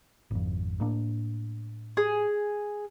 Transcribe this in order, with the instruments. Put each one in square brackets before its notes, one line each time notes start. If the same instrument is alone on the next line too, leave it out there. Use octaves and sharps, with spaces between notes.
[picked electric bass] G#1 F2
A2 A#3 D4
[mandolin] G#4